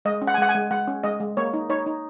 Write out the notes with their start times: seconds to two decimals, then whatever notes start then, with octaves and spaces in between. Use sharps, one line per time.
0.05 G#3 D#5
0.22 C#4
0.27 F#5
0.34 G#5
0.38 G#3 F#5
0.49 G#5
0.55 G#3
0.71 G#3 F#5
0.88 C#4
1.04 G#3 D#5
1.20 G#3
1.37 A#3 C#5
1.54 D#4
1.69 D#4 C#5
1.86 D#4